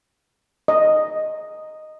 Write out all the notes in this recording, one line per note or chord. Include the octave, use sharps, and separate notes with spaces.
D#5